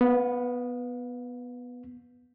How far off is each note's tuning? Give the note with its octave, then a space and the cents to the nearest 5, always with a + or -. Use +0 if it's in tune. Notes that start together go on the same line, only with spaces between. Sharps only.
B3 +0 F5 +40